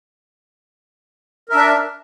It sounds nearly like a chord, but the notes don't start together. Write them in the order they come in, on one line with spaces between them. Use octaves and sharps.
A#4 E5 D4